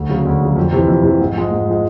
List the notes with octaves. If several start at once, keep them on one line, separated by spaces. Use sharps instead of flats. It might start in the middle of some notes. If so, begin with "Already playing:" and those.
Already playing: D2
C#3 F#3
D2
C#3 F#3
F2
C3 E3
F2
C3 E3
G#2
F3 G#3
G#2
F3 G#3